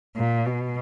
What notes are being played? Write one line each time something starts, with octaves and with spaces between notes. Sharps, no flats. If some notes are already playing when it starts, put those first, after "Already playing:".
A#2
B2